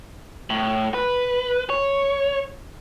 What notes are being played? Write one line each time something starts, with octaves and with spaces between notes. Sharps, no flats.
A2
B4
C#5